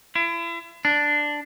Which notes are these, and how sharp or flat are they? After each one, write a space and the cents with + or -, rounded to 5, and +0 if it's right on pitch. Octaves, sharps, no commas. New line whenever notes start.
E4 +40
D4 +0